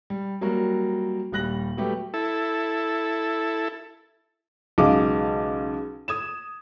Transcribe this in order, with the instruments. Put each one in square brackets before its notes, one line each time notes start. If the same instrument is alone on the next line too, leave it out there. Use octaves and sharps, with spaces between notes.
[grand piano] G3
F#3 G3 A#3 F#4 A#4
D#1 G3 F#6 A#6 F#7
F#3 G3 A3 B3 G4
[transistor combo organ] E4 A4
[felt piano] B1 C#3 G#3 F5 D6
D#6 G#6 E7